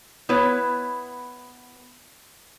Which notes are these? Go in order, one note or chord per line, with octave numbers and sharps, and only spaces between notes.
B3 E4 B4 C#5